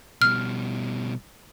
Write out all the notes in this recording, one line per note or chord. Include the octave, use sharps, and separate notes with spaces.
B2 G3 F6